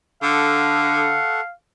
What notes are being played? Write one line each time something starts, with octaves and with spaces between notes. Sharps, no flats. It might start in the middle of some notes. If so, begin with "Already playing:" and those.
D3 A4 F5 F#5 C#6